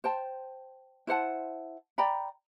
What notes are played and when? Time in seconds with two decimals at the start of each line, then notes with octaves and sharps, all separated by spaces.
0.04 C5 G5 A5
1.07 E4 C5 F#5 A5
1.98 D5 G5 A#5 B5